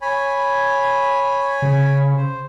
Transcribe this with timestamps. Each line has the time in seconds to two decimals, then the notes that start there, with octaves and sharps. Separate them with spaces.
0.02 C#5 G#5 B5
1.62 C#3
2.17 C5